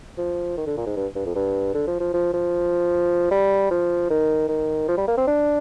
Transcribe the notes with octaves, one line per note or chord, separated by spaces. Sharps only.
F3
D#3
D3
A#2
G#2
G2
G2
F2
G2
D3
F3
F3
F3
F3
G3
F3
D#3
D#3
F3
G3
A#3
C4
D4